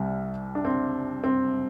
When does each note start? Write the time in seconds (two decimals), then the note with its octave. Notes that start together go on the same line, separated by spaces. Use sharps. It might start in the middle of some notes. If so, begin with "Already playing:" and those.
Already playing: C2 C3 G3
0.55 D4
0.65 C4
1.24 C4